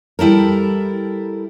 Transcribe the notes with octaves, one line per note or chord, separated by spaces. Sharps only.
G3 E4 A4 A#4